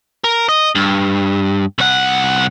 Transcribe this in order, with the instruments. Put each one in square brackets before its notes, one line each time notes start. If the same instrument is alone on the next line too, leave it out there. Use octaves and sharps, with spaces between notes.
[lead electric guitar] A#4
D#5
G2
C2 F#5